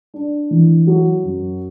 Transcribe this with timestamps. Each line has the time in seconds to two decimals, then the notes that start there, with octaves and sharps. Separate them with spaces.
0.14 D4
0.50 E3
0.87 F#3
1.23 F#2